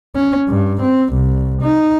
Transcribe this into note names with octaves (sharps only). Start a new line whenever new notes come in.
C#4
G2
C4
C2
D#4